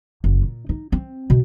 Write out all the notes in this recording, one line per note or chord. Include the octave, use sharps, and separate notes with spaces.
F#1
A#2
D#4
C4
B2